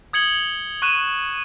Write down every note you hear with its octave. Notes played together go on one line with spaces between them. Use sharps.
D#6 G#6 C#7 F#7 G7
C#6 F#6 D#7 E7